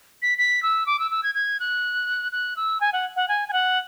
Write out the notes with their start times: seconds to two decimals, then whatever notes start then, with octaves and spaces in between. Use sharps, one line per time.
0.22 B6
0.38 B6
0.63 E6
0.86 D6
0.99 E6
1.11 E6
1.23 G#6
1.35 G#6
1.60 F#6
2.32 F#6
2.56 E6
2.81 G#5
2.93 F#5
3.16 F#5
3.28 G#5
3.48 G#5
3.53 F#5